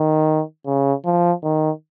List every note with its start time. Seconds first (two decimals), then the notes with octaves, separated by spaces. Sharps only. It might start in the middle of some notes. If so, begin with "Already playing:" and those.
Already playing: D#3
0.66 C#3
1.05 F3
1.43 D#3